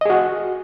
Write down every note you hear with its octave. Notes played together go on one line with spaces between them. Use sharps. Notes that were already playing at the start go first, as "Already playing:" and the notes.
F#4 G#4 D#5